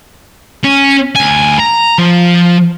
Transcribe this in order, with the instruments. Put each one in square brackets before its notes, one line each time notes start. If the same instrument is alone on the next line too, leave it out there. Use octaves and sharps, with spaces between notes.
[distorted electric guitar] C#4
D2 G#5
A#5
F3